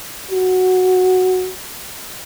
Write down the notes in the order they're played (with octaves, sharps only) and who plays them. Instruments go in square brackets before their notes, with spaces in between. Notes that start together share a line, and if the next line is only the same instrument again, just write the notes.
[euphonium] F#4